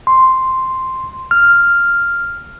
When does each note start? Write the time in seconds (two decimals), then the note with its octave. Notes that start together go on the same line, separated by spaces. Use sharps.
0.07 C6
1.31 F6